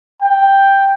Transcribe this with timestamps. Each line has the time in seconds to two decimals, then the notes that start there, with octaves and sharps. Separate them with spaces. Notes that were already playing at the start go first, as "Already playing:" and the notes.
0.22 G5